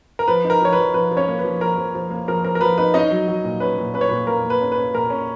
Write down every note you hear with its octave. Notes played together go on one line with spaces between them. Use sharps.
A#4
F3 B4
D#4
A#4
F3 C#5
B4
F3
F3 B4
F3
C#4 C#5
A#3
B4
F3
F3 A#4
F3
F3
A#3
F3 A#4
F3 A#4
A#4
F3 B4
D#4 B4
C#4 D#4 D#5
F#3
F#3
A#2
C#4 B4
A#2
C#4 B4
C#5
A#2 B4
A#3 A#4
A#3
B4
C#4
B4
C#4
A#2 A#4
C#4